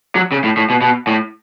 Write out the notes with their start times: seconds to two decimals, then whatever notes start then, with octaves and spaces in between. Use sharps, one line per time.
0.15 F#3
0.32 C#3
0.44 A2
0.57 A2
0.70 B2
0.82 B2
1.07 A2